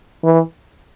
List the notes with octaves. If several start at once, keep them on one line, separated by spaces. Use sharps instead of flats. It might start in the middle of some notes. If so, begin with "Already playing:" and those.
E3